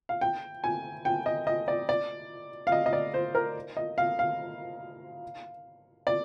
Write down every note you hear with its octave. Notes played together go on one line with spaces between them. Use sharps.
F5
G5
G#5
G5
D#5
D#5
D5
D5
F5
D#5
D#5
D5
C5
A#4
D#5
F5
F5
D5